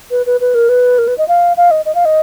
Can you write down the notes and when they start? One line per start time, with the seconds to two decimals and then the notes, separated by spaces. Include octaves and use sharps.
0.11 B4
0.26 B4
0.41 B4
0.55 A#4
0.69 B4
0.98 A#4
1.08 B4
1.18 D#5
1.28 F5
1.57 F5
1.71 D#5
1.85 D#5
1.95 F5
2.05 D#5